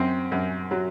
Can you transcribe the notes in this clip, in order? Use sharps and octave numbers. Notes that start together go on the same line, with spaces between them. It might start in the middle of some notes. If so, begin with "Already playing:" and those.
Already playing: F#2 C4
F#2
F#3